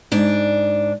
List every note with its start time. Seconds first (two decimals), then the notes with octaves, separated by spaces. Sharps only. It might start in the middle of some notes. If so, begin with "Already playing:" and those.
0.12 G#2 D4